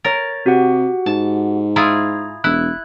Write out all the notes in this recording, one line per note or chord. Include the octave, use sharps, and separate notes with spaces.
A#4 C#5 A6
C3 F#4 G4 F#5
G#2 A5
E4 F4 G#4 A#5
E1 E4 F#6